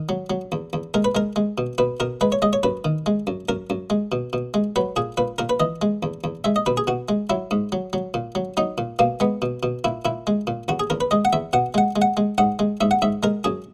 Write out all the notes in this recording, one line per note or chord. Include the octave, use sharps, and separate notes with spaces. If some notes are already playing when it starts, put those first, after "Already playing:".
Already playing: D#3
F#3
F#3
E2
E2
G#3 A#4
B4
G#3 A#4
G#3
B2
B2 B4
B2 A#4
G#3 B4
C#5
G#3 D#5
C#5
F#2 B4
D#3
G#3
F#2
F#2 A#4
F#2
G#3
B2
B2
G#3
F#3 B4
A#2 G#4
A#2 B4
A#2 A#4
B4
E3 D#5
G#3
E2
E2
G#3 E5
D#5
B2 B4
G#4
B2 F#4
G#3
F#3 E4
G#2
F#3
F#3
A#2
F#3
F#3 D#4
A#2
B2 A#3
G#3 B3
B2
B2
A#2 E4
A#2 E4
G#3
A#2
E2 F#4
G#4
E2 A#4
B4
G#3 D#5
F#5
E2 E5
B2 F#5
G#3 F#5
G#3
F#5
G#3
G#2 F#5
G#3
G#2 E5
F#5
G#2 E5
G#3 A#4
F#2 G#4